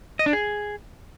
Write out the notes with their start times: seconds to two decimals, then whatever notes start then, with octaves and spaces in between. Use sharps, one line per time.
0.19 D#5
0.26 D4
0.33 G#4